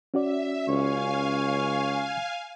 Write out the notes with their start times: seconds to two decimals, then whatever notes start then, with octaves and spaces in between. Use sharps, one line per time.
0.14 C#4 F#4 D5 E5
0.68 C#2 C#5 F5 G#5